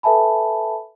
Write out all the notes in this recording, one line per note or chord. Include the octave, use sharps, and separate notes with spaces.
A4 B4 E5 G#5 A5 B5